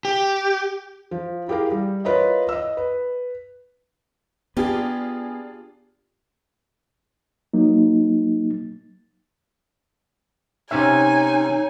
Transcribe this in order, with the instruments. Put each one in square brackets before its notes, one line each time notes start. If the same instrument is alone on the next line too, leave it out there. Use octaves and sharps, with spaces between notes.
[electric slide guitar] G4
[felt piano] F3
E4 G4 G#4 A#4 F5
G3
F4 A#4 B4 C#5 D#5 E5
D#5 E6
B4
[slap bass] B3 [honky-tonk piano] D4 F4 G#4 [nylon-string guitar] G4
[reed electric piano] F#3 A#3 D#4
[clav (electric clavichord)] C3 C#4 E5 [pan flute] D#4 [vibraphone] C#5 [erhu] G#5